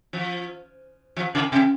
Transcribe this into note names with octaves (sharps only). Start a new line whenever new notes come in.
F3
F3
C#3
C3